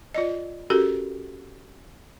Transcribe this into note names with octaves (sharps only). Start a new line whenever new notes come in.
F4 D5 D#5
C#4 F#4 G4 A4 A#4